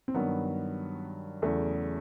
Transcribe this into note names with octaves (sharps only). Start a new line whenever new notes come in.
C4
G2 D#3 F#3 B3
E2 C#3 F#3 A3